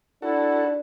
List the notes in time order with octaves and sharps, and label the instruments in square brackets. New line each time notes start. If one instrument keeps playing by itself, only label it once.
[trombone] D4 [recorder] E4 [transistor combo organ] F#4 A4